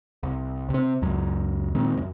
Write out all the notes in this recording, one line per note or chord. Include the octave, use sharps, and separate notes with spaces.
C2
C3 C4
C#2 F#2 F#3
A#2 D#3 G#3 C4
D#1 F#2